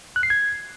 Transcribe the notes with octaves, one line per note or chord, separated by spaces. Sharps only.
F#6
C7
G#6